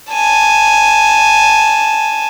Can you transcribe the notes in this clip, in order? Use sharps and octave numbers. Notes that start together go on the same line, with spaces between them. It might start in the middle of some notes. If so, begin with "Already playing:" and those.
G#5 A5